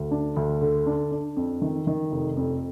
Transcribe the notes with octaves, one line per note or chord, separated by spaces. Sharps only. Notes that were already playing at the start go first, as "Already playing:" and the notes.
Already playing: D2
D4
D2
D3
D4
D4
F2
D#3
D#3
F1
F2